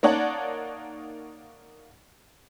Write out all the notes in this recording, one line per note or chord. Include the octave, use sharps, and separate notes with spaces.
A#3 D#4 C#5 D5 F#5 A5